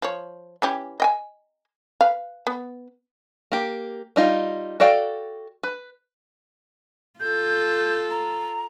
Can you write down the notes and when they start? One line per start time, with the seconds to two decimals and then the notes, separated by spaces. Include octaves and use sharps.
0.02 F3 C#5
0.62 E3 C#4 G4
1.00 D#5 G5 G#5
2.01 B4 F5
2.47 B3
3.52 A#3 G4
4.16 G3 D#4 F4
4.80 F#4 A4 D5 F5 G5
5.63 B4
7.20 F4 A4 G6
8.10 A#5